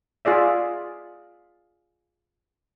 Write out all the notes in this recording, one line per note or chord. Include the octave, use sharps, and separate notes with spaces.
F4 G#4 D5 E5